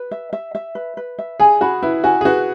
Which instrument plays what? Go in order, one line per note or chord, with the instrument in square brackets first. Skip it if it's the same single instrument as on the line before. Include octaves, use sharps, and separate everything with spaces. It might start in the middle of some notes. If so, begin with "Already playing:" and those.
Already playing: [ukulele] B4
E5
E5
E5
B4
B4
E5
[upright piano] G#4 [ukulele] G#5
[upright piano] F#4 [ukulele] B5
[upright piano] E4 [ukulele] B4
[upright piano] F#4 [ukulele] G#5
[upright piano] G#4
[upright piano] F#4 [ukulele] B4